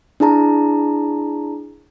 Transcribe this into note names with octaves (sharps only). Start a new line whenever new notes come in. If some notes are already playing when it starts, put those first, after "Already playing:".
D4 E4 G#4 A5 A#5